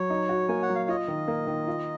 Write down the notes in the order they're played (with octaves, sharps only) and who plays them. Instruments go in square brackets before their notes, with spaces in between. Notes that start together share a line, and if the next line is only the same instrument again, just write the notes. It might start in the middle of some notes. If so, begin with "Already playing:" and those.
Already playing: [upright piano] F#3 [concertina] C#5
[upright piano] D#4
F#4
[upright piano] A#3 [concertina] G#5
[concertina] F#5
[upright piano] F#3
[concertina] F5
[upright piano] F4 [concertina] D#5
[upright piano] D#3
A#3
D#3
F4